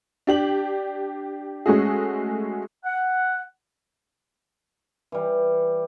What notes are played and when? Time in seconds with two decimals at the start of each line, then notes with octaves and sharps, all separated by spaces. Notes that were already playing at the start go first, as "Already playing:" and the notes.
0.27 D4 G4 F#7
1.66 G#3 A3 C#4 F#4 G#4
2.85 F#5
5.12 E3 G3